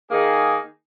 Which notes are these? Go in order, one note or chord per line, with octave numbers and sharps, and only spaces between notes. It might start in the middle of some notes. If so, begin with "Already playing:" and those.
D#3 A#3 D#4 G#4